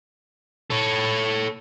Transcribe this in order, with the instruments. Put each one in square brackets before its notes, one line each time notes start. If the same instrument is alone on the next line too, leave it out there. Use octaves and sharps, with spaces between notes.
[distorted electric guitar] A4 C#5